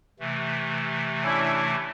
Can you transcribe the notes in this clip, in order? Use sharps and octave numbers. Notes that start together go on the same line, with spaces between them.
C3 E3 A3
C#4 D4 E4